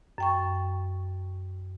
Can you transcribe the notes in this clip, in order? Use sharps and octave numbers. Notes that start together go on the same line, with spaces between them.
F#2 G5 C#6